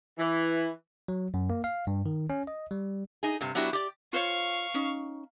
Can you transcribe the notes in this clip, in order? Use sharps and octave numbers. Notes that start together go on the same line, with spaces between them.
E3
F#3
F#2
A#3
F5
G2
D#3
C#4
D#5
G3
D#4 G#4
G2 C3
F#3 B3 D4 E4 F#4 G4
G4 D5
F4 C5 C#5 F5 C#6
C#4 D#4